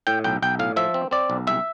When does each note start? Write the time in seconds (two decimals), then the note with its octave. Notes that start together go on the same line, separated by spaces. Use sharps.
0.07 A2 G5
0.24 B1 G5
0.42 B1 G5
0.59 A2 F5
0.76 F3 E5
0.94 C4
1.11 C4 D5
1.30 B1
1.47 C2 E5